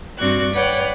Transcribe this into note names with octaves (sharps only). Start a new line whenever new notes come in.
G2 C4 F#4 D5 C#6 F#6
B4 C#5 D5 F#5 G5